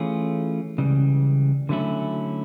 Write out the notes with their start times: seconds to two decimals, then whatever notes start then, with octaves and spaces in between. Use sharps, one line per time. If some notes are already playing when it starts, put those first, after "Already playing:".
Already playing: E3 A3 C#4 F4 G#4
0.78 C#2 C#3 E3 G3
1.69 D3 F#3 A3 C#4 E4